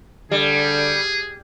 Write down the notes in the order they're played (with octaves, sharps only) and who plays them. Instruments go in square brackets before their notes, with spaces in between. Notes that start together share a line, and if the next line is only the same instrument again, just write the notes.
[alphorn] D3 [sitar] G3 [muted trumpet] G#4